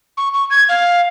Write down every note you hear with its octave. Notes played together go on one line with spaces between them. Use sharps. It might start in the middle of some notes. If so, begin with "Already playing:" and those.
C#6
C#6
G#6
F5